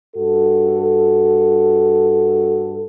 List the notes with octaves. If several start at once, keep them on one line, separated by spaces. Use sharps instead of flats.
G2 F#4 A4